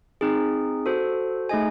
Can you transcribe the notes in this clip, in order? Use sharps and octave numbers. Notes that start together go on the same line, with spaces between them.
C4 D#4 G#4
F#4 A4 C5
A3 D#4 G#4 D#5 G#5